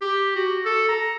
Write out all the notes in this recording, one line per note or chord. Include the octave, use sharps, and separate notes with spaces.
G4
F#4
A4
A#5